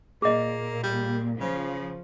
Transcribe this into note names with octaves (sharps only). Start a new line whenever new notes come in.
A#2 A#3 G#4 D#5
G3
C#3 F3